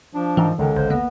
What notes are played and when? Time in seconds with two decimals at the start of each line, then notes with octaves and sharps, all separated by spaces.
0.15 F3 D4
0.37 G#2 D#3 E3
0.59 C#2 D3 D#3
0.76 A1 C5
0.90 D#2 A#3 B3